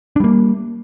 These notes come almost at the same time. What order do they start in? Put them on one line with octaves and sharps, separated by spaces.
D4 G3 A#3